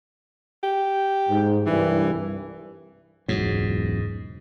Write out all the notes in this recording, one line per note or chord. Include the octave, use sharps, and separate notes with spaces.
G4
G#2
C2 G2 E3
E1 C#2 G#2 F#3